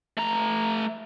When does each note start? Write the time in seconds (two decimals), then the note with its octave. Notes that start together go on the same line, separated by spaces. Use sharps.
0.17 A3 A#5